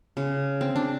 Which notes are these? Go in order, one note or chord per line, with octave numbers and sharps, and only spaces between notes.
C#3
C4
D4